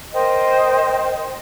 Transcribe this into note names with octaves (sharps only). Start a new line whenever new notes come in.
A#4 C5 D#5 G5